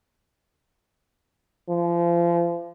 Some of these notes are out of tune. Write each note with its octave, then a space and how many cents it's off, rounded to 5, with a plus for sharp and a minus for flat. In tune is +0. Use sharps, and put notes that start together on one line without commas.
F3 -30